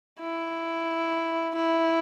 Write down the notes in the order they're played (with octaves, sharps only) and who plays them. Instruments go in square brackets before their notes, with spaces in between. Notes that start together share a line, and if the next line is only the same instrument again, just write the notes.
[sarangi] E4
E4